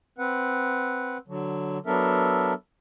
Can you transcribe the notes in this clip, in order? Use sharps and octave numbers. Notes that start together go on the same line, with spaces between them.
C4 B4 F#5
D3 F#3
F#3 B3 D4 A4 A#4 E5